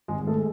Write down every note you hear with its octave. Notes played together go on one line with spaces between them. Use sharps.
G#1 G#3 G#4
A3 A4
G#3